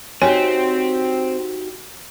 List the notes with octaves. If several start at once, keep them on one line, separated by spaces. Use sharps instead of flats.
C4 D#4 F#4 G4 C#5 G#5